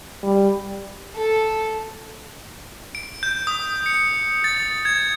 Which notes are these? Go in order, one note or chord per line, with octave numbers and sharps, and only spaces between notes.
G3
A4
D7
G6
D#6
C#7
A6
G#6